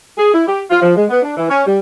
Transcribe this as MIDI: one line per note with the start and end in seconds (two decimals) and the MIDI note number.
0.18 0.33 68
0.33 0.44 64
0.47 0.62 67
0.70 0.81 65
0.82 0.96 53
0.97 1.05 56
1.10 1.22 59
1.23 1.34 62
1.37 1.46 52
1.50 1.62 61
1.66 1.78 55